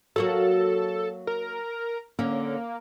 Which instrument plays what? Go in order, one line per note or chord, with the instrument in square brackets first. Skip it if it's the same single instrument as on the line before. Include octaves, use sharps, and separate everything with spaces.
[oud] F#3 A#3 F#4 [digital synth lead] A4
[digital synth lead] A#4
[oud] D3 C#4 [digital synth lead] A#3